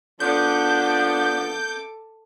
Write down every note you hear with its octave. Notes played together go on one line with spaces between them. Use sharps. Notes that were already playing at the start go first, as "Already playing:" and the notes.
F3 B3 D4 A4 D6 G6